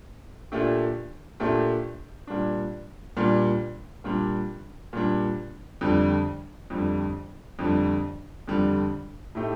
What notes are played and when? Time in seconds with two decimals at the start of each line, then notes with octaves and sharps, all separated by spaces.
0.52 A#2 A3 D4 G4
1.40 A#2 A3 D4 G4
2.27 A#2 G3 D4
3.16 A#2 G3 D4
4.04 A#2 G3 D4
4.93 A#2 G3 D4
5.81 F2 D3 G3
6.70 F2 D3 G3
7.59 F2 D3 G3
8.48 F2 D3 G3
9.35 A2 A3 D#4 G4